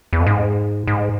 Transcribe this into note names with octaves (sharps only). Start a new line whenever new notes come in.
E2
F2
G#2
G#2